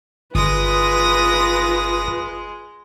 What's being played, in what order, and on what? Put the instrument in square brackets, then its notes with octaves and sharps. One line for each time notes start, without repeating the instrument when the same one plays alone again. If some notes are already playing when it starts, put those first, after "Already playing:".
[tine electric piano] G1 [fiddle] G#3 [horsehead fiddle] F4 B4 [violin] D#6 A#6